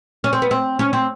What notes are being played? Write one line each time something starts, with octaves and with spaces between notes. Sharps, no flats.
C#4
C4
B3
C4
C#4
C4